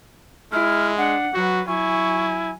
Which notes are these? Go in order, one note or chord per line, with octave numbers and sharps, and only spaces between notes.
G#3 E4 F6
D4 F#5
F#3 F#4 B4
F#3 E4 G#5 C#6